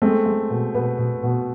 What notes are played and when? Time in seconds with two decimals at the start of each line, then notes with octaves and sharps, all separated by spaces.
0.02 G#3 A3 C4
0.26 G#3
0.50 B2
0.74 B2 B3
0.98 B2
1.23 B2